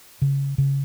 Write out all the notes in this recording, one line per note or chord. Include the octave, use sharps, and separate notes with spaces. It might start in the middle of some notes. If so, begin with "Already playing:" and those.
C#3
C#3